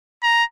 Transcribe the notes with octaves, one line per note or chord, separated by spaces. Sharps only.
A#5